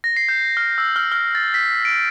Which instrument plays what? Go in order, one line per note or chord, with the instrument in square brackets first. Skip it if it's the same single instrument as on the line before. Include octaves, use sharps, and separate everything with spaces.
[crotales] A#6
C7
G6
F6
E6
F6
F6
A6
B6
D7